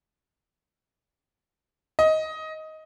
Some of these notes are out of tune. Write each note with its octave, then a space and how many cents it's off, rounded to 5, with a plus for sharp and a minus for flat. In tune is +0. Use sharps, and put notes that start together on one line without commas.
D#5 +15